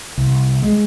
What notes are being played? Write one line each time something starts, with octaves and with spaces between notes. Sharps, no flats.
C2
G#3